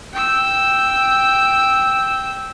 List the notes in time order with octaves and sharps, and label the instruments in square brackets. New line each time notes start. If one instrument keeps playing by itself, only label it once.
[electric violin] G5 E6